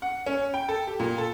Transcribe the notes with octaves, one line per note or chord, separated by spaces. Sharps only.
F#5
C#4
G5
A4
G4
A#2
A4